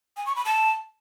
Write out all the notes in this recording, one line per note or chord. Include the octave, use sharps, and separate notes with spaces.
G#5
C#6
B5
A5